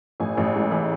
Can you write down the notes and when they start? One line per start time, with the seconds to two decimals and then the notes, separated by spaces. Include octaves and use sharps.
0.20 A1 G#5
0.37 A1
0.54 G#2
0.71 E3